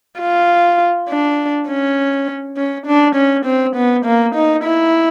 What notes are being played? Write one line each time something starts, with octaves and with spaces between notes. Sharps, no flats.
F4
D4
C#4
C#4
D4
C#4
C4
B3
A#3
D#4
E4